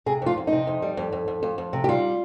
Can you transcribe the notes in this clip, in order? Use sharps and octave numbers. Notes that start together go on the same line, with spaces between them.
C3 G#4
F2 F4
F2
D#4
C3
F2
G3
F2
F2
F2
F2
F2
C3
G4
G3 F4